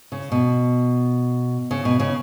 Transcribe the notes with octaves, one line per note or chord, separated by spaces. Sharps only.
C#3
B2
C#3
B2
C#3